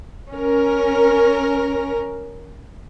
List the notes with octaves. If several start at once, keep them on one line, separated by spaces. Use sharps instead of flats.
C#4 A#4